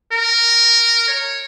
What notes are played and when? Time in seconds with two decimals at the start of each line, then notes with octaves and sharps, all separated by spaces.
0.12 A#4
1.08 C#5